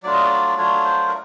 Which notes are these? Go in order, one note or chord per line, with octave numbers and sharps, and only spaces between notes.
F#3 A3 D4 F4 D5
D#5
D5
F#3 A3 D4 F4 C#5
C5
A#4